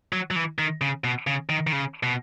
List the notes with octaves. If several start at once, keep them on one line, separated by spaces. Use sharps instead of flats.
F#3
F#3
E3
D#3
C#3
B2
C#3
D#3
D#3
C#3
B2